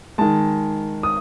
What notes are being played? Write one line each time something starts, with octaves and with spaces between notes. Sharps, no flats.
D#3 G#3 A5
D#6